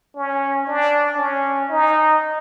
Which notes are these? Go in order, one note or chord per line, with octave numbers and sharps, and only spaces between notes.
C#4
D4
C#4
D#4